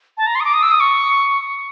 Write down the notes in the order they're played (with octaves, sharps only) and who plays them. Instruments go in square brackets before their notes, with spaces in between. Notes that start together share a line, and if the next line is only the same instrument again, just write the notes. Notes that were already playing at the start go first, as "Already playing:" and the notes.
[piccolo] A5
A#5
C6
D#6
D6
D#6
E6
D#6
C#6